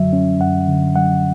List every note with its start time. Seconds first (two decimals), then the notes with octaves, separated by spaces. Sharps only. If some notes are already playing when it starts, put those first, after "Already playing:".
Already playing: F#2 D3 F#3 E5
0.13 C#4
0.40 F#2 F#5
0.68 D3
0.96 F#3 F#5